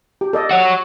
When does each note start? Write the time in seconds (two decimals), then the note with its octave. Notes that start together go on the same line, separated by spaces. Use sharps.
0.21 G4
0.33 A4 D5 D#5
0.51 F#4 C#5